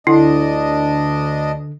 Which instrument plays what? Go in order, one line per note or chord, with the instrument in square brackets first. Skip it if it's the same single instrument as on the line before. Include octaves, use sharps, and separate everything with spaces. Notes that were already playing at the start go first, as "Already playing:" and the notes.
[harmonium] D2 D4 D#5 [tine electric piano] D3 [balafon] E4